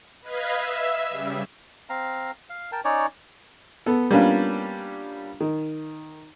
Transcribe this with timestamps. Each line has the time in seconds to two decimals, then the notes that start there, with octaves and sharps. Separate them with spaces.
0.22 B4 D#5 F5 G#6 B6
0.56 E5 E6
1.10 C#3 G3
1.89 C4 F5 A#5
2.50 F5
2.72 A#4 G5 A5
2.84 C#4 D#4 C#5 D5
3.86 B3 A4
4.11 G3 A#3 B3 C#4 D4 F4
5.40 D#3